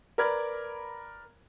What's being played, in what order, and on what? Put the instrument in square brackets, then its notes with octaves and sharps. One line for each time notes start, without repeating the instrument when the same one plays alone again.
[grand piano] A#4 B4 D5 B5 F6 G#6